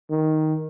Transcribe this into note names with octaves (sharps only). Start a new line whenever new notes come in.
D#3